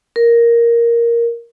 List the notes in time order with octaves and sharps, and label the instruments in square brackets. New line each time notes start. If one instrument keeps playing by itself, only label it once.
[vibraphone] A#4